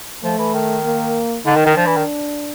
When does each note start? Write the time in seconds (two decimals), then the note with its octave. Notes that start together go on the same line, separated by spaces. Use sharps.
0.23 F3 A3
0.38 E3
0.54 D#3
0.84 A#3
1.45 D3 D#4
1.56 D#3
1.66 D#3
1.75 F3 D4
1.86 E3
1.96 D#3